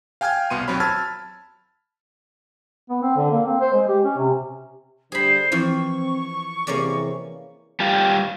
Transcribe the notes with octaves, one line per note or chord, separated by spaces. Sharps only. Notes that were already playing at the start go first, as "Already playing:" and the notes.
F5 G5 G#5 F6 G6 G#6
C2 B2 B3 C6 D#7
D#2 F#3 C4 C#5 B5
A5 B5 E6 F6 G#6 A6
B3
C4
D3
A#3
C4
C5
G#3
G4
C#4
C3
D3 G3 G#4 C5 B5
E3 F3 C4 C#6
C3 E3 A#3 C#4 G#4 D5
G3 F4 G4